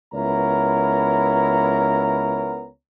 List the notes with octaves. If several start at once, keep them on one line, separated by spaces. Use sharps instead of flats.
C#2 B3 E4 A#4 C#5 A#5